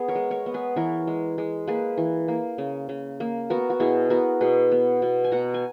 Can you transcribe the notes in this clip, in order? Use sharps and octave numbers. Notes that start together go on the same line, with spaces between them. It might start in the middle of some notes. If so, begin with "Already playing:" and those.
Already playing: B3 G#4
A#4 C#5
G#3
A#4 C#5
B3
G#4 B4
E3 A#4 C#5
G#3
G#3
A#3 G#4 B4
E3
A#3
C#3
C#3
A#3
B3 F#4 A#4
F#4
B2 E4 G#4
B3 F#4 A#4
B2 G#4 B4
B3
B2
G#5
B2 F#5 A#5
G#5